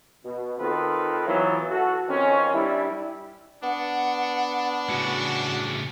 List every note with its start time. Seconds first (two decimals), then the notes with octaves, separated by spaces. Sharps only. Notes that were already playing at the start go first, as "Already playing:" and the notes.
0.24 B2
0.58 D#3 C4 F4 A4 B4
1.26 E3 F#3 B3 E4 F4
1.71 F#4 A4
2.08 F2 D#3 C4 C#4
2.52 G3 D4 E4
3.63 B3 D4 F#5
4.89 A2 C#3 F#4